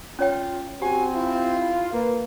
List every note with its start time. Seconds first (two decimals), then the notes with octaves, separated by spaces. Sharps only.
0.19 C#4 F4 C#5 G5
0.82 C4 F#4 G4 G#5
1.15 E4 F4
1.93 A#3 B4